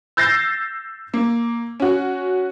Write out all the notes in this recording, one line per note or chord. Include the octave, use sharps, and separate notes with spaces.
E6 G6 A6 A#6 C7
A#3
C#4 F#4